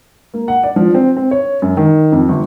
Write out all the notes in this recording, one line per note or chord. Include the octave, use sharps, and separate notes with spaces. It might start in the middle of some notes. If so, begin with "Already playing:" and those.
A#3
F#5
D5
F3
C4
C4
C#5
F#2
D#3
F2
G1